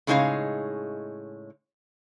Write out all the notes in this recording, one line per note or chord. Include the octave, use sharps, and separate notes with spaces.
A2 C#3 G#3 D#4 C#5 F5